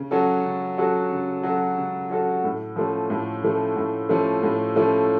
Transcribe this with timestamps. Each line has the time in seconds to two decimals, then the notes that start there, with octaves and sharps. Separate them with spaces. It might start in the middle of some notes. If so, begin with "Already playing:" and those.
Already playing: C#3
0.11 F#3 C#4 F#4 A4
0.45 C#3
0.78 F#3 C#4 F#4 A4
1.11 C#3
1.43 F#3 C#4 F#4 A4
1.77 C#3
2.10 F#3 C#4 F#4 A4
2.44 A2
2.76 F3 A3 C#4
3.10 A2
3.43 F3 A3 C#4
3.76 A2
4.09 F3 A3 C#4
4.43 A2
4.76 F3 A3 C#4